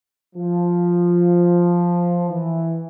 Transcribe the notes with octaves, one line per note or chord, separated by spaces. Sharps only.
F3
E3